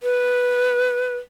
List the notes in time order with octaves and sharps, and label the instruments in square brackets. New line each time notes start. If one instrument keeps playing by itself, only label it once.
[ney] B4